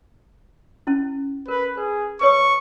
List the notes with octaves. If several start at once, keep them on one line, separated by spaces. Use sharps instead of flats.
C#4 E4
A#4 B4
G#4 B4
B4 C#5 C#6 D#6